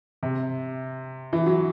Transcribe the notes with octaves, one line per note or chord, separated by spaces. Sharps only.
C3
E3
F#3